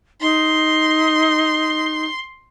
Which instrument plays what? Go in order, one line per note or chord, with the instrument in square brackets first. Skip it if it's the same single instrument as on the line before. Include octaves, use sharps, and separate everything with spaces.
[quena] D#4 [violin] C6